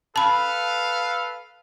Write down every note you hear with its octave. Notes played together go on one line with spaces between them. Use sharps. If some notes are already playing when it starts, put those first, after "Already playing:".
A4 B4 F5 A5 B5